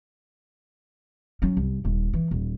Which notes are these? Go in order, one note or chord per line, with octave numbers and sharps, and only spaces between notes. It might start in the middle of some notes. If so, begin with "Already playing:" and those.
F#3 C#4
C2
D#1
E3
D#1